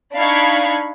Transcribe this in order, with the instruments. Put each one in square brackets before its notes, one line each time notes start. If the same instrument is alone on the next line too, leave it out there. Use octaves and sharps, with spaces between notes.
[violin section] D4 D#4 F5 B5 C#6 G#6